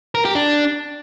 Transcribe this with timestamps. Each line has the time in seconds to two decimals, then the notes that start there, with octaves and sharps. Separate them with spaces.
0.15 A#4
0.25 G4
0.35 D4